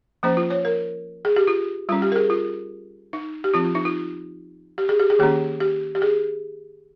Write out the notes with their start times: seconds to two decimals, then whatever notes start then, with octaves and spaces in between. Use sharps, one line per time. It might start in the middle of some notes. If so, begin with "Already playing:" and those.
0.23 F3 A#3 C#4 C5
0.37 F4
0.50 C#5
0.65 A#4
1.25 G#4
1.36 G4
1.47 F4
1.89 G3 C#4 F4
2.02 G4
2.12 A#4
2.16 G#4
2.30 F4
3.13 D#4
3.44 G4
3.54 F3 C4 F4
3.65 F4
3.75 D#4
3.85 F4
4.78 G4
4.89 G#4
5.00 G4
5.10 G#4
5.19 D#3 A#3 C#4 G4
5.60 G4
5.95 G4
6.02 G#4